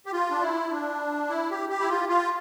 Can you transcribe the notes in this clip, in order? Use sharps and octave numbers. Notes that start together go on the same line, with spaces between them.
G4
F4
D4
E4
D4
E4
G4
G4
E4
F4
F4